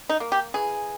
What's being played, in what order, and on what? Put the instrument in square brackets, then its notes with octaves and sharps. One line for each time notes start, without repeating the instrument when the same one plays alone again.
[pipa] D#4
A#3
G4
E3 G#4